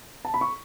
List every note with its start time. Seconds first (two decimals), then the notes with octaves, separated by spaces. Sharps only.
0.25 A5
0.34 B5
0.41 C#6